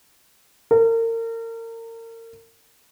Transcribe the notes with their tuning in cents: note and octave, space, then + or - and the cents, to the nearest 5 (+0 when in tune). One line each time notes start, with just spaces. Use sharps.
A#4 -35